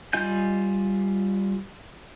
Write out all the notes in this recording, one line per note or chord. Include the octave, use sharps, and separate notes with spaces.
G3 F4 D#5 G#5 G6